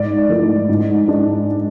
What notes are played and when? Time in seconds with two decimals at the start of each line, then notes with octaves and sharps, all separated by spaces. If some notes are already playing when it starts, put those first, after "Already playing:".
Already playing: G#2 D5
0.29 F3 A3 E4
0.69 G#2
1.08 G#3 D4